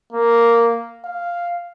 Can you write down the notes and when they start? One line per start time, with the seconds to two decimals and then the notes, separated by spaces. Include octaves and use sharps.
0.13 A#3
1.05 F5